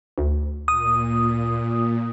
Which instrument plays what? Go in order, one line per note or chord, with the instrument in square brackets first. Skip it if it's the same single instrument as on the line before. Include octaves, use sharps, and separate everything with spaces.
[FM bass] D2
[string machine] A#2 [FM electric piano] D#6